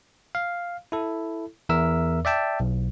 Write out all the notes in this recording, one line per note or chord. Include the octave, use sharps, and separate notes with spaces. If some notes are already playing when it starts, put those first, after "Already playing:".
F5
E4 A4
E2 A#4 E5 E6
D5 E5 G5 A5
B1